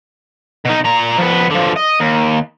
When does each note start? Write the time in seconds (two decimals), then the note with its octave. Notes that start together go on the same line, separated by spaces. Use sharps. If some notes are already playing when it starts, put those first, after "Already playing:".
0.65 B2 D#4
0.84 A#2 A#5
1.18 F3 B3
1.50 D3 F3
1.76 D#5
2.00 D#2